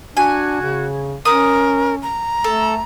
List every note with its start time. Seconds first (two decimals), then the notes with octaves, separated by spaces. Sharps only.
0.17 D4 F#4 G#5
0.61 C#3
1.25 C#4 A#4 D#6
2.03 A#5
2.44 A3 A4